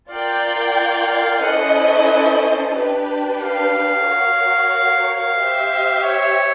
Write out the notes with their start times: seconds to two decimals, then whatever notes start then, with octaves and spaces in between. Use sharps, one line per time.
0.11 F4 A#4 D5 F5 G5
1.42 C#4 E4 A4 C5 D#5 F#5
1.75 F#5
2.74 D4 G4 B4
3.40 F5
4.06 F#4 A#4 C#5
5.38 G4 C5 E5
6.04 C#5